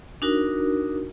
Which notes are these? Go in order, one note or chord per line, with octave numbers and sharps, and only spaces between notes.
D4 D#4 F#4 A#4